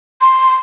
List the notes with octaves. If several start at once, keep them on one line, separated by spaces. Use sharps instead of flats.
C6